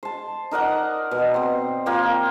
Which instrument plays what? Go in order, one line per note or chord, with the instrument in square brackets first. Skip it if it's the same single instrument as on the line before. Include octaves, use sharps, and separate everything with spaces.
[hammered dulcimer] C5 A5
D#4 A#4 D5 F#5
B2
C4 C5
F3 A#3 F4 G4